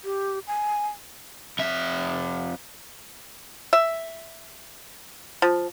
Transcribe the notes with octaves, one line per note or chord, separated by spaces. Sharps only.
G4
G#5
F2 E5
E5
F3